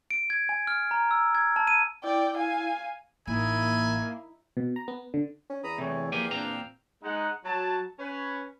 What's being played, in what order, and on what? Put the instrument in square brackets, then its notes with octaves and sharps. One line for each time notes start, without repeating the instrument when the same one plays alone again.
[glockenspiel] D7
G#6
G#5
F6
A#5
E6
G#6
A5
D#7
[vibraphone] E4 [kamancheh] D5 [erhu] G5
[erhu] F5 [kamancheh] G#5
[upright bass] A1 [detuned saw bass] A#3 [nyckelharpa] D#4 E4 [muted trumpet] G#5
[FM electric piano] B2
A#5
B3
D3
[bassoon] C#4
[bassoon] E2 [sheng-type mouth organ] A#5 B5 D#6
[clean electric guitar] C3 E3 [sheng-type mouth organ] A3 [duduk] C#5
[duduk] F3 [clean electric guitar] A#3 G4 G#5 [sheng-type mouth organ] F5 G5
[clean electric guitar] A#2 C4 A#5 [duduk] D4
[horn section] G#3 D#4 F#5
F#3 A5
C#4 B4 C#5